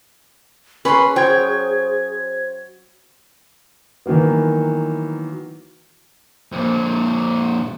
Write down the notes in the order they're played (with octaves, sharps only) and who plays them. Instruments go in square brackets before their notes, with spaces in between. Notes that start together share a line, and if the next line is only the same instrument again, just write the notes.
[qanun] C#4 [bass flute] G#4 [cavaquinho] B4 B5 C6
[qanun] F#3 [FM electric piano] C5 G#6 [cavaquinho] G5
[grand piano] D#3 E3 F#3 A#3 B3
[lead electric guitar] F2 A#2